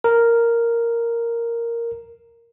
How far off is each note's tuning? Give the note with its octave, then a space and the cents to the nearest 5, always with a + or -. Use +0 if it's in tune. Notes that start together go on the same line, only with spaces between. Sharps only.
A#4 -5